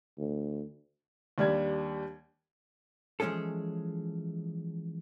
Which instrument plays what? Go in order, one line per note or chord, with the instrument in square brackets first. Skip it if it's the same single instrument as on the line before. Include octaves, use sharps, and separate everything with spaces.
[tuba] D2
[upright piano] D#2 G3 D4 G#6
[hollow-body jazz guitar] E3 F3 G#3 C#4 G#4 A4